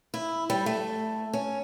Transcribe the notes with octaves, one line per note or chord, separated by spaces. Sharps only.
E4
G3
A3
C#4